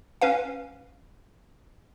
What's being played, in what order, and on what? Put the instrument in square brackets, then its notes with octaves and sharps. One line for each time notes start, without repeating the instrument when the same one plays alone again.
[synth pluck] C#4 B4 F5